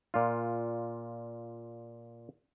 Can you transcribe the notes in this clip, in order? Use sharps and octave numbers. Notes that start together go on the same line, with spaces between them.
A#2 F4